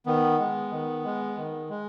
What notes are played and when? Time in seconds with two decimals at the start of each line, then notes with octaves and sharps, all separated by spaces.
0.06 D#3 B3
0.39 G#3
0.72 D#3
1.04 G#3
1.37 D#3
1.70 G#3